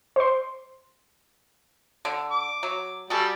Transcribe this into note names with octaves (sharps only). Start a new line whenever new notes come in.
C5 C6
D3
D6
F#3
G3 F#4 G#4 A4